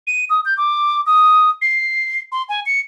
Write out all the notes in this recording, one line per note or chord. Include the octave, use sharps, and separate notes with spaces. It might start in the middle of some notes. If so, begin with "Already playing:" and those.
D#7
D#6
G6
D6
D#6
C7
C6
G#5
C#7